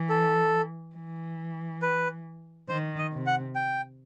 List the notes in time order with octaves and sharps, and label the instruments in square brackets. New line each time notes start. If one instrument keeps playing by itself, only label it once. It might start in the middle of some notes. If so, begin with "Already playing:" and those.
Already playing: [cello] E3
[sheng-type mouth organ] A4
[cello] E3
[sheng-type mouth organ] B4
[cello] D#3 [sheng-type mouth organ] C5
[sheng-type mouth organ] D#5
[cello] C3
[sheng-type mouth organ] F#5
G5